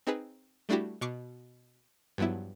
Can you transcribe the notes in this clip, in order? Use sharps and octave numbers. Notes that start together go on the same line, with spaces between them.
C4 D#4 G#4 B4
G3 A3 D4 E4 F#4 G4
B2 C#6 D6 C7
G2 F3 F#3 B3 E4